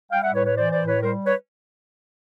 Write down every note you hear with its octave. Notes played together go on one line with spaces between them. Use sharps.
G3 F5 G5
E5 F#5
A2 B4 C#5
B4 C#5
E3 C5 D5
C5 D5
A2
B4 C#5
G3 A#4 C5
B4 C#5